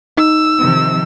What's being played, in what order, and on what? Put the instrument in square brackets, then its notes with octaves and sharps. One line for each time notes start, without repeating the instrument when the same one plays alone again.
[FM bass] D#4 [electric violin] E6
[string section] C3 D#3 F3